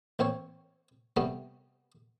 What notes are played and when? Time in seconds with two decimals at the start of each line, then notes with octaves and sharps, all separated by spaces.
0.19 A1 C4 C5 C#5
1.17 C3 G3 A3 B3